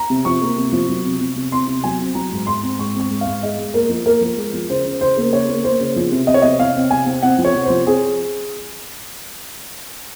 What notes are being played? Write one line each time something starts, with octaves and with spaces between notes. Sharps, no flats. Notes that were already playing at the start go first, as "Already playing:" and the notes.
Already playing: A#5
C3
F3 C#6
A#3
C3
F3
F#3
C3
C3
C3
C4 C6
C3
F#3 G#5
C4
F#3 A#5
G#2
G#2 C6
C4
G#2 C#6
C4
C#6
G#2
F5
G#2
G#3 D#5
G#3
A#2 A#4
F3
A#2 A#4
F3
G#3
F3
C#3 C5
C#3
C#3 C5
A#3
C#3 C#5
A#3
A#3 C5
C#3
F3
C3
C3 D#5
C#5
C3 D#5
C3 F5
C4
C3 G#5
C4
C4 F#5
F3
C#5
C3
F3 C5
C4 G#4